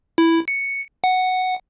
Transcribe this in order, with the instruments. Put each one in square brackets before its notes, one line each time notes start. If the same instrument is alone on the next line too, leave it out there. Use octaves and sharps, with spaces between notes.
[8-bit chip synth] E4
C#7
F#5